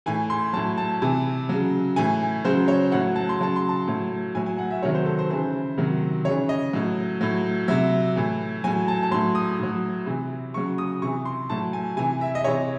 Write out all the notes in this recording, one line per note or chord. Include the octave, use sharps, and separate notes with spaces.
A2 E3 G#5
C6
A2 F#3 A5
A5
C3 E3
C#3 F#3
A2 E3 G#5
C#3 F#3 C5
C#5
A2 F#3 F#5
A5
C6
C#3 F#3 A5
C6
A5
A2 F#3
A2 F#3 G#5
G#5
F#5
E5
C3 D#3 F#3 C#5
C5
A4
C5
C#3 E3 C5
C3 D#3 F#3
C#3 E3 C#5
D#5
A2 F#3
A2 F#3
C3 F#3 E5
A2 E3
A2 F#3 G#5
A5
A5
A2 F#3 C6
D#6
A2 F#3
C3 E3
C#3 F#3 C#6
D#6
C3 E3 C#6
C6
A2 F#3 A5
G#5
C3 E3 G#5
E5
D#5
C3 E3 C#5